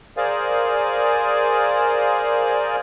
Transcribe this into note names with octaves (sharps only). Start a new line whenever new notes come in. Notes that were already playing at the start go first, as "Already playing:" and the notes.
G#4 A#4 C5 D5 F5 G#5